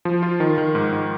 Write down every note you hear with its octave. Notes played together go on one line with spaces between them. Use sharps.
F3
F4
D#3
D#3
G#2
G#2